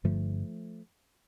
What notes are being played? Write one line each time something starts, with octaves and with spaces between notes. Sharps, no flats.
G1 G2 D3 F3 A3